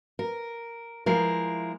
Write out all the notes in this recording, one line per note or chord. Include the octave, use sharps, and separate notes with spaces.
A#4
F3 G#3 E4 A#4